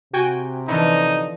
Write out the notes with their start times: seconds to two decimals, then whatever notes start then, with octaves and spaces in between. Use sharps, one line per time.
0.13 C3 F#4 G5 G#5
0.68 D3 E3 F3 D#4 E4